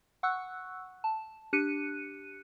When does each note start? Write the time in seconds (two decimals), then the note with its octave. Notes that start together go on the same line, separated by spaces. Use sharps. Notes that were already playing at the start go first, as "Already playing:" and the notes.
0.23 F#5 C#6 E6 F#6
1.04 A5
1.53 D4 G4 F#6 C#7 D#7